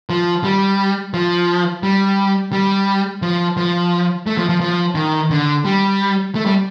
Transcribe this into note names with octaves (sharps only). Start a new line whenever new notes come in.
F3
G3
F3
G3
G3
F3
F3
A3
F3
F3
F3
D#3
D3
G3
A3
G3